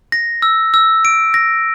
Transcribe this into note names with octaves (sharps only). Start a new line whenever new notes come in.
A#6
E6
E6
D7
A#6